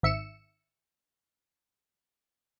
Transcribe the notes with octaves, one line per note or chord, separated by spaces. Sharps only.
G#1 E5 C#7 E7